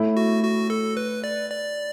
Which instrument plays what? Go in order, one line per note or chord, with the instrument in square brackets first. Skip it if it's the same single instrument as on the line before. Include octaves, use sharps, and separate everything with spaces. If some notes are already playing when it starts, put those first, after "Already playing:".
Already playing: [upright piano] A2 A3 E4
[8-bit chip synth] F#4
F#4
A4
B4
D5
D5